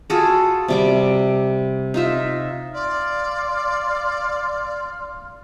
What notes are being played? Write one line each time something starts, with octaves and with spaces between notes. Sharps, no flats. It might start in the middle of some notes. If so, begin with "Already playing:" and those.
F4 F#4 G#4 A4
C3 G3 D6
D#4 F4 E5
D5 F5 C6 F6